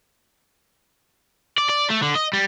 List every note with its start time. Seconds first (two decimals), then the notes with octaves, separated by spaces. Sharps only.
1.58 D5
1.69 D5
1.90 A3
2.03 D3
2.16 D#5
2.33 G3